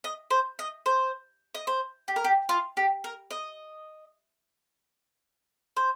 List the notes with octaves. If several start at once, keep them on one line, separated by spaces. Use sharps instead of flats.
D#5
C5
D#5
C5
D#5
C5
G4
A#4
G4
F4
G4
A#4
D#5
C5